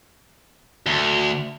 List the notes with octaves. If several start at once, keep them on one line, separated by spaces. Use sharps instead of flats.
D2